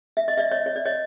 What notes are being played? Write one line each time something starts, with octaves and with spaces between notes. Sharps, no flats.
E5
D#5
D5 E5
C#5 D#5
C#5
D5
C#5 D#5